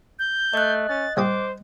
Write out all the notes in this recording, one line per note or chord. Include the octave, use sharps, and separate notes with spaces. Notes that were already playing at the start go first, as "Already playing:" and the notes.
G6
A3 D#5 F#6
C#4 A6
C2 C4 C5 D6 D#6